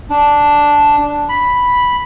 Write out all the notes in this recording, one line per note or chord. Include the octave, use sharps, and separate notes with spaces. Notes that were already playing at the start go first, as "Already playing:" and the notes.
D4
B5